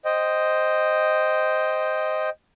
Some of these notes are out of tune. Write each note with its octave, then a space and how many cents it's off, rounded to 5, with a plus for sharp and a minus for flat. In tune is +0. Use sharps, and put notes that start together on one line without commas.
C5 +0 D#5 +0 G5 +0